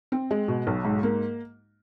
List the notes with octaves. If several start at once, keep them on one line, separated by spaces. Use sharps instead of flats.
C4
G#3
B2
B1
G#2
A#3